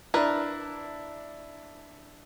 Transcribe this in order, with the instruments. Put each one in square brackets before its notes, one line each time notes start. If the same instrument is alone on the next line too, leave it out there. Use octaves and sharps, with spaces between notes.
[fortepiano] D4 E4 [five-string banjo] A#4 B4